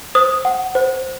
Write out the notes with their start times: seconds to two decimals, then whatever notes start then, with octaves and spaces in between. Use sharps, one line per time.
0.15 C5 D#6
0.45 F#5
0.75 C5